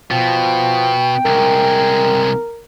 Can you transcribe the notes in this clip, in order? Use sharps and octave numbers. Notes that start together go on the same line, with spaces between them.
B2 F3 G5
C2 G#3 A#4